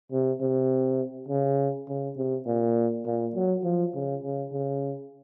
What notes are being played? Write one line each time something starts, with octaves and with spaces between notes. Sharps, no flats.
C3
C3
C#3
C#3
C3
A#2
A#2
F#3
F3
C#3
C#3
C#3